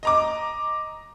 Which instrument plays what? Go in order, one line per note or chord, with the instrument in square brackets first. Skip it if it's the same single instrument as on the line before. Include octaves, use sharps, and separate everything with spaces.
[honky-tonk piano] D#5 A#5 D6